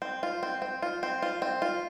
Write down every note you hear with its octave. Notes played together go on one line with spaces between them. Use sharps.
C4
F4
C4
C4
F4
C4
F4
C4
F4